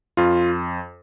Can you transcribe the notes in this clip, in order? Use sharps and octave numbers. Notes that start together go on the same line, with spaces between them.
F2 F4